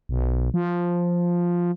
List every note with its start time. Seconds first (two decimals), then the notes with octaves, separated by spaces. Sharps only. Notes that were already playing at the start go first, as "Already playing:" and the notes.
0.09 B1
0.54 F3